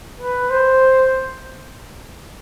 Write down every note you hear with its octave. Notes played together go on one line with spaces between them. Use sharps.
B4
C5